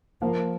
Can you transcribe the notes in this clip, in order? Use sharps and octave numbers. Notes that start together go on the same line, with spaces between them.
F3 A#3